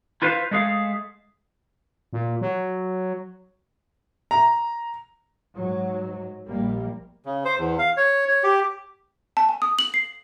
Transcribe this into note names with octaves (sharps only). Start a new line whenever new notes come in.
E4 F4 B4 C5 F5
G#3 A3 G#4 F5
A#2
F#3
A#5
G#2 F#3
A#1 G3 A#3
C#3
C5
E2
F5
C#5
C#5
G4
A5
G#5
D#6
F#7
C7